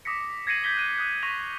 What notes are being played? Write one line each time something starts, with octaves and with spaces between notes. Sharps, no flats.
D6 D#6 A#6 B6 C#7
G#6 A#6 C7 C#7 D#7 F#7
G6 G#6 B6 G7
F#6 D#7
D#6 F#6 G6
C#6 G#6 A#6 B6 D#7 F7